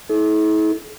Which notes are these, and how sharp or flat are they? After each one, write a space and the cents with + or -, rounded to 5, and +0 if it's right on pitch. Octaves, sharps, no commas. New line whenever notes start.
E4 -40 A4 -45